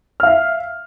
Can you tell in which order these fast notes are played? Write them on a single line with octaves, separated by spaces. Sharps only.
F6 F5 E5